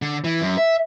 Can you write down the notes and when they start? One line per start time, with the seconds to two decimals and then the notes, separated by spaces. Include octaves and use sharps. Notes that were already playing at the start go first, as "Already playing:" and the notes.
0.02 D3
0.24 E3
0.42 F#2
0.58 E5